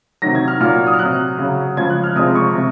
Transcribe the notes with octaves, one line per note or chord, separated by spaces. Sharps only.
C3 D#3 F#3 A#6
G#6
F6
A#2 F#3 F6
D#6
F6
C3 F#3 F#6
C#3 F#3
C#3 F3 G#3 G#6
F#6
F6
C3 F3 G#3 D#6
C#6
C3